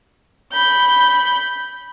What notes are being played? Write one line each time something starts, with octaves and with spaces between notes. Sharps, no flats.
B5 G6